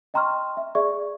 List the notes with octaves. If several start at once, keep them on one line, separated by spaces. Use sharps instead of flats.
D#5 G5 A#5 C6 C#6 F6
E5
G#4 D5 E5 C#6